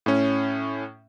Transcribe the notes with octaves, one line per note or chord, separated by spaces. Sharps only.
A2 C#4